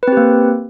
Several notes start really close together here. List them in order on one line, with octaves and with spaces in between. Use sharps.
B4 C4 G4 A#3